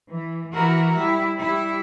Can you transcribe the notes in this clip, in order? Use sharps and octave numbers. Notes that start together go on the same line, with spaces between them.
E3
E3 E4 F#4 A#4
G3 E4
G3 E4